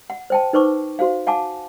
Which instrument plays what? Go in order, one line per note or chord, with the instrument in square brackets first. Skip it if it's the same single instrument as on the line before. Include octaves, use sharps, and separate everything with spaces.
[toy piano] F#5
C5 G5 A5
D#4 B4 C5 C#6 D6
F#4 C5 F5
F5 F#5 G#5 A5 D6